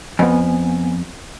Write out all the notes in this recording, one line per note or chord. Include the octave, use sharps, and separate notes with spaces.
F2 B3 G#5